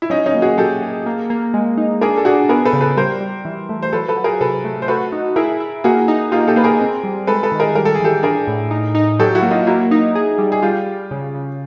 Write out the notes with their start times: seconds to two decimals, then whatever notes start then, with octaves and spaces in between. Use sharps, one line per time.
0.02 E4
0.10 F#3 C#4 D#4
0.26 C#4 D#4
0.34 A#3
0.42 F#4 G#4
0.58 F#3 G4 A4
0.82 G#4
1.06 A#3
1.30 A#3
1.54 G#3
1.77 D#4
2.01 D4 G#4 A#4
2.17 A4
2.25 D4 F#4 G#4
2.49 B3 G#4 A#4
2.65 A4 B4
2.73 C#3
2.81 A4 B4
2.97 G3 A#4 C5
3.21 G3
3.45 E3
3.69 A3
3.82 C5
3.93 F#3 A4 B4
4.08 A4 B4
4.17 F#3
4.24 G#4 A#4
4.41 C3 A4 B4
4.64 A3
4.82 C5
4.88 F#4 A4 B4
5.12 D#4
5.36 E4 G#4 A#4
5.60 E4
5.84 A#3 F#4 G#4
6.08 D#4
6.32 A#3 F4 G4
6.48 G4 A4
6.56 A#3 B4
6.64 G#4 A#4
6.81 C4
7.04 G3
7.27 G#3 A4 B4
7.43 A4 B4
7.52 D#3
7.60 G#4 A#4
7.75 G3 A#4
7.85 A4
7.95 G#4
8.00 E3 G4 A4
8.23 D4 G#4 A#4
8.47 A2
8.71 D#4
8.95 D#4
9.19 F#3 G4 A4
9.35 E4 F#4
9.42 A#3
9.51 D#4 F4
9.67 A#3 E4 F#4
9.91 D#4
10.15 G#4
10.38 G3
10.52 G#4
10.62 G3 F4 G4
10.86 G3
11.11 C#3
11.35 C#3